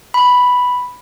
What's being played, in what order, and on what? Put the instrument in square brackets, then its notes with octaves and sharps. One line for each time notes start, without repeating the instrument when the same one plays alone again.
[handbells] B5